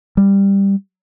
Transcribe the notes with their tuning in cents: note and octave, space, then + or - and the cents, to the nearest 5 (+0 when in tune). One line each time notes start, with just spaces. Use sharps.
G3 +10